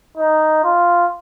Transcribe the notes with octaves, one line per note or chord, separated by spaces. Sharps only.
D#4
F4